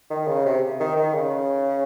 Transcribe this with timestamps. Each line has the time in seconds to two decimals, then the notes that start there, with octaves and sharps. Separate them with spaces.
0.10 D#3
0.28 C#3
0.46 C3
0.80 D#3
0.97 D#3
1.14 C#3